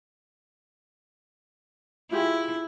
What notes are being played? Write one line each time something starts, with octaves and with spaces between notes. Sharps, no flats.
E4 F4 G4 G#4